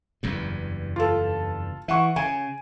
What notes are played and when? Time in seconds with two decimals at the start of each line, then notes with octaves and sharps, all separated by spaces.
0.23 F#1 E2 G2
0.96 F4 A4
1.88 E3 E5 F#5 C#6
2.16 C#3 G#5